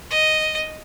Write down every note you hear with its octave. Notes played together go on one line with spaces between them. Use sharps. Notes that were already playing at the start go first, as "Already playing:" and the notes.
D#5